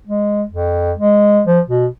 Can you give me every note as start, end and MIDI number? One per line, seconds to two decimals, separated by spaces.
0.07 0.43 56
0.51 0.92 41
0.97 1.41 56
1.47 1.60 53
1.68 1.87 47